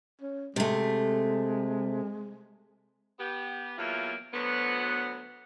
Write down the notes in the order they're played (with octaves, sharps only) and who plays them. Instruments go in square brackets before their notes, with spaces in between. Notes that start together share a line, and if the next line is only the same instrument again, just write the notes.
[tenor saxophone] C#4
[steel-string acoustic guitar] C3 A3 [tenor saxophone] G#3
[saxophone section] B3 G4
E2 F#3 A#3 F4 E5
D2 F#3 B3